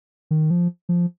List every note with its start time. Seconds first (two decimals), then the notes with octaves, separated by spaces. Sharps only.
0.31 D#3
0.50 F3
0.89 F3